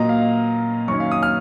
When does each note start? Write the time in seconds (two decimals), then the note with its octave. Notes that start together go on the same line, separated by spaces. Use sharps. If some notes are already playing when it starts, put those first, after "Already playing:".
Already playing: A#2 F#3 A#3 D#5 A#5
0.09 F5
0.88 F#2 D#3 A#3 C#4 C#6
1.00 F5
1.11 D#6
1.23 F6